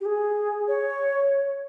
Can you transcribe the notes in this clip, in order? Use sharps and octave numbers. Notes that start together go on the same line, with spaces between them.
G4
G#4
C#5